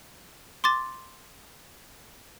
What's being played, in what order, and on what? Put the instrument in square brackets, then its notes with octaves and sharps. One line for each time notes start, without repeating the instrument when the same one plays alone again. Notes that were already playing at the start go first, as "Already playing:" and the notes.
[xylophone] C6 D6 A6